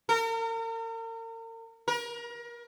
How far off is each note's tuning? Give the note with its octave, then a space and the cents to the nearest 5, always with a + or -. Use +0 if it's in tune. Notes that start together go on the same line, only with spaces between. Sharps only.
A#4 -40
A#4 +30